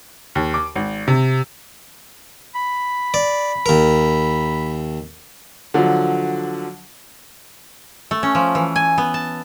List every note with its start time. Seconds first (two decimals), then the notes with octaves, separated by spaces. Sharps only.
0.35 D#2
0.54 D6
0.76 G#1
1.08 C3
2.55 B5
3.14 D5
3.66 D#2 A#4
5.74 D3 F3 F#3
8.11 A3
8.23 C#4
8.35 F3
8.55 E3
8.76 G#5
8.98 B3
9.14 A5